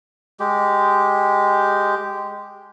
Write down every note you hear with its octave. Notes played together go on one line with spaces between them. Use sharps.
G#3 G4